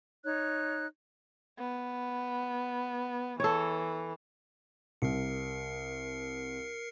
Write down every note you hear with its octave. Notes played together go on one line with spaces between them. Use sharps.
D#4 C#5 F#6
B3
E3 A4 C#5
C2 A#4 C7 C#7